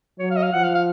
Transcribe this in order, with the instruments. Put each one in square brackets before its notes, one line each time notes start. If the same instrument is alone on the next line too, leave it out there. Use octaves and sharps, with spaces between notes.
[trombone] F#3 [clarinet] C#5
[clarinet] F5
D#5
F5
[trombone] F3 [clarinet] F#5
[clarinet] F5
F5